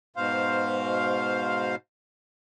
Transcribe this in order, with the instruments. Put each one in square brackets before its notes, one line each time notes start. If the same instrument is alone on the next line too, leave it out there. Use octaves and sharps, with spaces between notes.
[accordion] G#2 B2 C5 F5